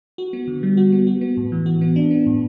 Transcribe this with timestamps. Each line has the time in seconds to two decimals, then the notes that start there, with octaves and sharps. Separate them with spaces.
0.18 F#4
0.33 B3
0.48 D3
0.63 G3
0.77 F#4
0.92 B3
1.07 F#4
1.21 B3
1.37 A2
1.52 E3
1.66 F#4
1.81 B3
1.96 D4
2.11 B3
2.27 A2